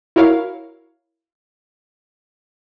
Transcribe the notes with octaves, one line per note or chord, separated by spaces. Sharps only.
E4 F#4 A#4 C#5 F5